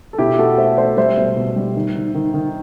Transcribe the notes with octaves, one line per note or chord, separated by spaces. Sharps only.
A4
B2 E4 G4
A3 F#4 A4
A3 C5 E5
A3 A4 C5
G3 C5 E5
B2
B2
G3
D#3
D#3
D#3
D#3